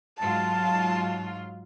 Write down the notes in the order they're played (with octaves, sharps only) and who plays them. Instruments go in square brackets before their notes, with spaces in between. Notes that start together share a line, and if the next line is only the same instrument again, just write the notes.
[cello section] G#2 F#3 F4 [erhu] A5